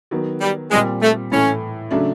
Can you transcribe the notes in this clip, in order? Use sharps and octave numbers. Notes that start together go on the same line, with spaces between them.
D#3 F#3 B3
G3
A#2 G3 G#3 C4
A3
A2 E3 A3 C#4
C#3 F#3 A3 D4